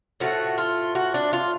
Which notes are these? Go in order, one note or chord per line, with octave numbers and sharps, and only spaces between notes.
A2 F3 A3 F#4
F4
F#4
D4
F4